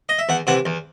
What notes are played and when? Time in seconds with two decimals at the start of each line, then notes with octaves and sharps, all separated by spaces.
0.09 D#5
0.19 E5
0.29 E2 F#5
0.47 C3 E3 F#5
0.66 E2